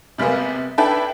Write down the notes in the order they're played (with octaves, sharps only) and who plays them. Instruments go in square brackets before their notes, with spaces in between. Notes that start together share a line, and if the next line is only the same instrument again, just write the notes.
[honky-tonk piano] C3 G3 G#3 A#3 B3
D4 E4 A4 B4 G5